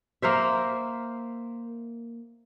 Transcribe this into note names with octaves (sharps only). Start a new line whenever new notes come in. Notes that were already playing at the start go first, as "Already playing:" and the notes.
A#3 A#4 C5 E5